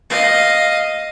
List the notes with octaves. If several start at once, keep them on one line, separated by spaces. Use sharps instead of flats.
D#5 F5